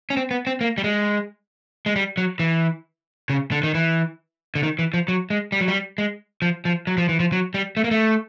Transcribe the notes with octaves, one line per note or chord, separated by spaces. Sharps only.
C#4
C4
B3
C4
A#3
G3
G#3
G#3
G3
F#3
E3
C#3
D3
D#3
E3
D3
D#3
E3
F3
F#3
G#3
G3
F#3
G3
G#3
F3
F3
F#3
F3
E3
F3
F#3
G3
A3
A#3
A3